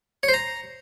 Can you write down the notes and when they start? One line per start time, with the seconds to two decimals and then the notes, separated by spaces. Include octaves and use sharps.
0.23 C#5
0.28 C5
0.34 A#5